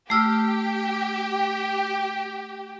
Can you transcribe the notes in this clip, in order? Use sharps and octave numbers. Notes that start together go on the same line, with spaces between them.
A3 G4 E6 F6